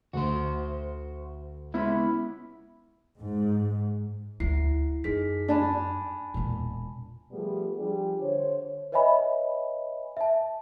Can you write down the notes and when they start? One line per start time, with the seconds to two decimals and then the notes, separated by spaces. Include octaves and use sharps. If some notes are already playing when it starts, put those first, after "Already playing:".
0.13 D2 F#4 C5
1.74 G#3 B3 C#4 E4 B5
3.19 G#2
4.40 D2 E4 C7
5.04 F#2 D#4 G#4 B6
5.49 D4 G#5 A5 B5
6.34 E1 A#2
7.32 F3 G3 A3 B3 G4 G#4
7.77 F3 G3 D4 G4 G#4
8.21 D3 C5 C#5
8.92 B4 C#5 D#5 E5 G#5 B5
10.17 E5 A5